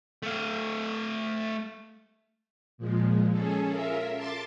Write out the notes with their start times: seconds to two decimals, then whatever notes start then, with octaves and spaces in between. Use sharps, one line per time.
0.23 A3 F5
2.78 A#2 F3 G#3
3.30 C#4 G#4 A4
3.70 F4 A#4 E5
4.15 A5 C6 D6 A6